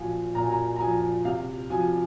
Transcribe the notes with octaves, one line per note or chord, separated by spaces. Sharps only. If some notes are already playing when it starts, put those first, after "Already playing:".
Already playing: A#2 F3 F5 G#5
A#2 A#5
G#5
A#5
A#5
F3 G#5
C3 F5
F3 G#5